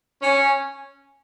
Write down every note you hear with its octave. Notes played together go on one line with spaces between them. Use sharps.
C#4